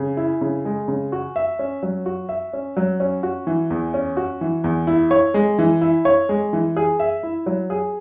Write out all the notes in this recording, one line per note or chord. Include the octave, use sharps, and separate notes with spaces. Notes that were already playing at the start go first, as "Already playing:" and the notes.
Already playing: C#3
E4
C#3
G#3
C#3
F#4
E5
C#4
F#3
F#4
E5
C#4
F#3
C#4
F#4
E3
E2
C#4
F#4
E3
E2
E4
C#5
G#3
E3
E4
C#5
G#3
E3
G#4
E5
E4
F#3
G#4